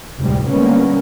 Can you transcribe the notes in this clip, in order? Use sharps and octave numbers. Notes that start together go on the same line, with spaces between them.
F1 D2 A2 F3 G3 G#3
D3 G3 G#3 A#3 B3 C#4